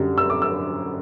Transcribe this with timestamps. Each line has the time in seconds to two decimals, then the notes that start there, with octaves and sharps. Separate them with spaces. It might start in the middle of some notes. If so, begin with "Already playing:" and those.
Already playing: F#2 D3 G3
0.18 E6
0.30 D6
0.42 E6